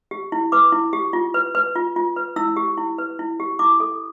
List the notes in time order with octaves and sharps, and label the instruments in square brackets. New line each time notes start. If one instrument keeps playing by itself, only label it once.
[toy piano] G4
E4
B4 D6
E4
G4
F4
B4
B4
F4
F4
B4
E4 E6
G4
E4
B4
E4
G4
E4 D6
A4